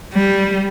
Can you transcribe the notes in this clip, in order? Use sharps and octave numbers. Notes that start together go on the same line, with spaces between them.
G3